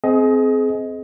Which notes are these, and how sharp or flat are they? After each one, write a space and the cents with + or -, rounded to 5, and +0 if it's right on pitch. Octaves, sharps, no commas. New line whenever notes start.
C4 -15 G#4 +30 D#5 +15